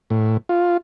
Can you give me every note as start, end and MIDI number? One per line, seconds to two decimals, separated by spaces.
0.10 0.37 45
0.49 0.77 65